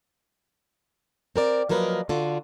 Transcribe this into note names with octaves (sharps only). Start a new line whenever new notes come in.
C4 A#4 D5
F3 F#3 A#3 A#4 B4 D#5
D3 F4 F#4